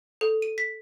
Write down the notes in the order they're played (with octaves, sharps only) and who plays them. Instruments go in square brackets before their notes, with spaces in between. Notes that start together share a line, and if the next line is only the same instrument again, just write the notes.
[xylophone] A4
D#7
B6